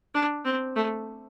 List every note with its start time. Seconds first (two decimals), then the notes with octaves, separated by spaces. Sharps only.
0.14 D4
0.45 C4
0.76 A3